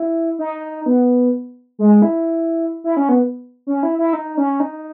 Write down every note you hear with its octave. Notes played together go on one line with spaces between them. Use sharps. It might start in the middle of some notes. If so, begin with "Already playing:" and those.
Already playing: E4
D#4
B3
G#3
E4
E4
C#4
B3
C#4
E4
E4
D#4
C#4
D#4